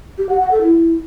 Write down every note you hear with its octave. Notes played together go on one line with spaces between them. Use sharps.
G4
F#5
F#5
A4
E4